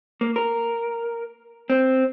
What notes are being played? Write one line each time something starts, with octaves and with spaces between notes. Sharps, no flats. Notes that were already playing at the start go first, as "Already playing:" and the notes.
A#3
A#4
C4